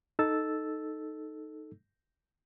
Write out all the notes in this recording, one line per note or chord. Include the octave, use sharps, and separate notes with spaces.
D#4 A4 E6 A6